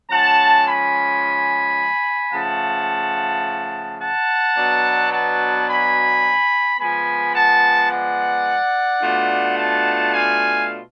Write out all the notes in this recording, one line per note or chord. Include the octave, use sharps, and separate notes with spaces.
F3 G#3 C#4 F#5 A5
G#5 B5
C#3 F3 A3 F#5 A5
F#5 A5
B2 F#3 B3 D4
F#5 A5
G#5 B5
F3 G#3 B3 G#5 B5
F#5 A5
D5 F#5
B2 A3 D4 F4
F#5 A5
F5 G#5